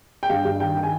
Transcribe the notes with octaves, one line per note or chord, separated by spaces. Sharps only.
G5
G2 F5
G2
D#3 G5
D#3
G#5